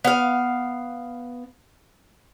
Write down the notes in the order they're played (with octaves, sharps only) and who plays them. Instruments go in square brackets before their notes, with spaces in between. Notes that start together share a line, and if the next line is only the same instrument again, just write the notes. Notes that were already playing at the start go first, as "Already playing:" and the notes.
[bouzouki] B3 F5